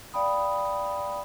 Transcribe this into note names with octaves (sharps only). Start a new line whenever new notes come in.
D5 F5 G5 B5 D#6